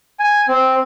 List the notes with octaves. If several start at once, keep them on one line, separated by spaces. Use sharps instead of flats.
G#5
C4